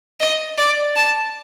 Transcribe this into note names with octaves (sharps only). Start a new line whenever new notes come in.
D#5
D5
A5